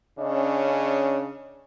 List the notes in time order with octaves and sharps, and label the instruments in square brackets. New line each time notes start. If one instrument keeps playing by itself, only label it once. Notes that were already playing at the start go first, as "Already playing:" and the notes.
[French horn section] C#3 C#4 D4 D#5